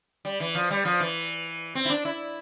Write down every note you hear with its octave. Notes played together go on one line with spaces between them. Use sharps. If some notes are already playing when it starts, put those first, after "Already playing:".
G3
E3
F3
G3
F3
E3
C4
E4
D4
E4